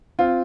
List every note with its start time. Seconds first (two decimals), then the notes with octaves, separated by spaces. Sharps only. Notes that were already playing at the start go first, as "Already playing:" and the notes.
0.19 C4 F4